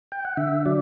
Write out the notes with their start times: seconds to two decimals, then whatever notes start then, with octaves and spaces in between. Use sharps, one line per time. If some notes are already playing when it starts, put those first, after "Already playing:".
0.12 G5
0.25 F#5
0.37 D3 E5
0.66 F#3 D5